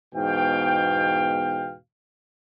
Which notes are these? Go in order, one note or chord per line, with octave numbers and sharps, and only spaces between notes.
E2 G#2 B2 F5 G5